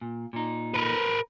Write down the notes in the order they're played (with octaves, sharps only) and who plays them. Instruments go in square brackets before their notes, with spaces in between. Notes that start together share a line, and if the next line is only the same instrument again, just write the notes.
[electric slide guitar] A#2
A#2 D#4
[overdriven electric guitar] A#4 B4